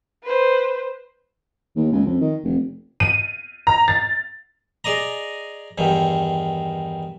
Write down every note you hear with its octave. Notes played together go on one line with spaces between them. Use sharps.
B4 C5
D#2
C#2
F2
D#3
F1
D#7
A#5
A6
G#4 D5 D#5 A#5
E2 G2 D#3